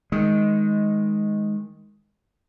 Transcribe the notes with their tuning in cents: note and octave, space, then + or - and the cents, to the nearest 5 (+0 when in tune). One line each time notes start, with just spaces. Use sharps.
D#3 +5 G#3 +0